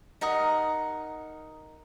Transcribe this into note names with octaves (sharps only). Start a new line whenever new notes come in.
D#4 A#4 F#5 D#6